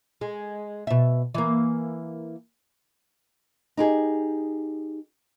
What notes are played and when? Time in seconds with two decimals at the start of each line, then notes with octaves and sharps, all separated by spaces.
0.21 G#3
0.87 B2 E5
1.34 E3 A#3
3.77 D#4 G4 G#4